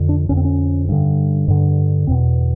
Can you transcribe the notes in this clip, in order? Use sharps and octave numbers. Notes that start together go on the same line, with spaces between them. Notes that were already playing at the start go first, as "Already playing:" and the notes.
Already playing: F2 D3
D4
F2 D3 C#4
C4
C#4
G2 D3
G2 D3
E2 B2 C4